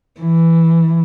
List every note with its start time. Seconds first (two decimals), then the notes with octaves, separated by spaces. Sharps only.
0.21 E3